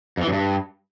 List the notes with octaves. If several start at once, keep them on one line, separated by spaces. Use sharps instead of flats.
F2
E3
F#2
G2